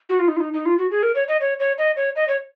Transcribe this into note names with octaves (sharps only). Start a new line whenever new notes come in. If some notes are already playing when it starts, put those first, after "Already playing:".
F#4
F4
D#4
F4
D#4
D#4
F4
F#4
G#4
A#4
C#5
D#5
C#5
C#5
D#5
C#5
D#5
C#5